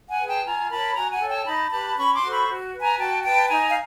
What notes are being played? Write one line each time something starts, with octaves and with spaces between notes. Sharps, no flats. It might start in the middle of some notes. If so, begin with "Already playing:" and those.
F#5 G#5
G#4 B4
G5 A5
F4 G#5 A#5
A#4 C#5 A5 B5
F#4 G#5 A#5
F#5 G#5
A4 C#5
G5 A5
D#4 A5 B5
G4 B4 A5 B5
C#4 B5 C#6
C6 D6
F#4 A4 C5
B5 C#6
F#4
B4
G#5 A#5
F#4 G5 A5
B4 G5 A5
D#4 G#5 A#5
F5